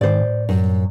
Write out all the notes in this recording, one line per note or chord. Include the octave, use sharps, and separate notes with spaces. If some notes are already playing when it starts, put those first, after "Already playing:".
G#2 D#3 C5 D5
A2
F#2